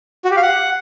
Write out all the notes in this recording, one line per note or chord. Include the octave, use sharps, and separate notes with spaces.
F#4
G4
F5
F#5